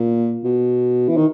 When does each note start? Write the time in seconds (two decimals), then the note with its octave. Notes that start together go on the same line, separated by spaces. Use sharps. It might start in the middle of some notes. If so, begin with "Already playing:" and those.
Already playing: A#2
0.44 B2
1.08 E3
1.16 D#3